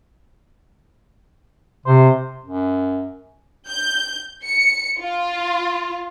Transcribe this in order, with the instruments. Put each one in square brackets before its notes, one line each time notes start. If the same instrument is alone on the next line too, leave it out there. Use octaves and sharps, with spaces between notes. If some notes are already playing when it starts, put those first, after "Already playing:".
[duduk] C3 [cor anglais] C5
[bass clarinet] F#2
[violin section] G6
C#7
F4